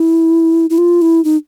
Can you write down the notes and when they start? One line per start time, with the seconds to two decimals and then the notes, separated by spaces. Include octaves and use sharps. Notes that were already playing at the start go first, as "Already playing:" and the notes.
Already playing: E4
0.70 E4
0.78 F4
1.02 E4
1.24 D#4